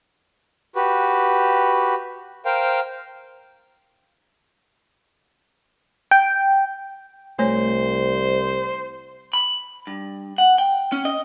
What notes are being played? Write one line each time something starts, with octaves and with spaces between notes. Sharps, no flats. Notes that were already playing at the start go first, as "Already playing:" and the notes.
F#4 G4 B4
A#4 C5 F5 G5
G5
C2 A3 C5 C#5
B5
G2
F#5
G5
C#4
D#5